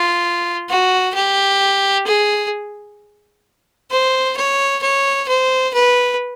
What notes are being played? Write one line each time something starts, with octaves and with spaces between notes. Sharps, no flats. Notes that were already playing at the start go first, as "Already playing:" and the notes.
Already playing: F4
F#4
G4
G#4
C5
C#5
C#5
C5
B4